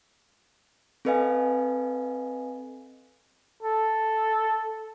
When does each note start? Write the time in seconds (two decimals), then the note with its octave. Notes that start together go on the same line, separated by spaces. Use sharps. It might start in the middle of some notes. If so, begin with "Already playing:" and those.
1.05 C4 A4 B4 D#5 F5 G#5
3.63 A4